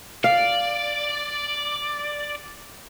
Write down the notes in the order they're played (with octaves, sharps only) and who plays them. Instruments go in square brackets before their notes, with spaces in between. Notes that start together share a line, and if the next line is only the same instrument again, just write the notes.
[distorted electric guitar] D5 [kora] F5